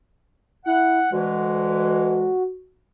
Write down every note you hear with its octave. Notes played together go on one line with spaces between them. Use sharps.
E4 F#5
D2 E3 G#3 F#4